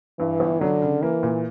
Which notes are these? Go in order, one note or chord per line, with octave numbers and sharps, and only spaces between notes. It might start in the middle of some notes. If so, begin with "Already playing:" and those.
G2 E3
G1
D3 F#3
C#3
E3 A#3
A#2